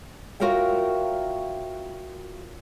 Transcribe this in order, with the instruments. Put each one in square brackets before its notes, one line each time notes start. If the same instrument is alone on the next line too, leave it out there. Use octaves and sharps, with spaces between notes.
[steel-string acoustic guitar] F4 F#4 A#4 C#5 E5 G5